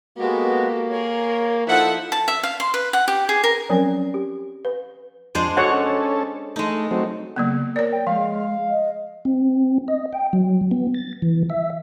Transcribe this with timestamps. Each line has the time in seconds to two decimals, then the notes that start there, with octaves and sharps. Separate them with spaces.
0.18 G#3 A#3 B3 F#4 G4 A4
0.90 G#4 A#4 C#5
1.68 F3 D#4 E4 A4 C5 E5 F#5
2.12 A5
2.28 E5
2.43 F5
2.60 C6
2.74 B4
2.93 F#5
3.08 G4
3.29 G#4
3.44 A#4
3.69 F3 F#3 C4 C#4 A#4
4.14 G4
4.65 B4
5.35 F2 G#3 D4 C5
5.57 F#4 A4 C#5 F#5
5.72 C#4 A4
6.56 G#3 A3 D#4
6.91 F#3 A3 C4
7.36 C#3 F#3 A#3 B3
7.76 A#4 C#5 D5
7.92 G5
8.07 F3 G#3 F5
8.70 D#5
9.25 C4
9.88 D#5
10.13 G5
10.33 F#3
10.71 B3
10.95 A6
11.22 E3
11.50 E5